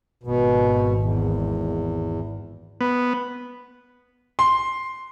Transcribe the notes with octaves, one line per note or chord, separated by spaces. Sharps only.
G#1 B2
E2
B3
C6